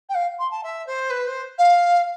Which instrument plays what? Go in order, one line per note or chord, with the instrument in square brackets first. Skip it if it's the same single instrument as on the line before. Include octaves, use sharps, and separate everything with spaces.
[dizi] G5
F5
C6
A5
E5
C5
B4
C5
F5